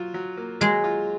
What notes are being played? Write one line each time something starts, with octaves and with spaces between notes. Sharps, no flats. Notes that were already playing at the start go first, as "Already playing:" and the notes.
Already playing: F#3 F4
F#3
A#3
F#3 G#3
F4